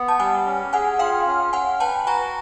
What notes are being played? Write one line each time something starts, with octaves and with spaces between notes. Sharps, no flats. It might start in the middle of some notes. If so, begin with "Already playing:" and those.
Already playing: B3
A5
G3 F#5 G#5
C#4
G#4 F#5 G#5
F4 F5 G5
C#4
C#4 F#5 G#5
B4 G5 A5
F#4 G#5 A#5